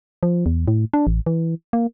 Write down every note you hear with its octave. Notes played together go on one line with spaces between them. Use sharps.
F3
E2
A2
D4
A1
E3
A#3